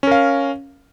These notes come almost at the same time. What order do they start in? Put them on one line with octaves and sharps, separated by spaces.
C#4 A#4 F5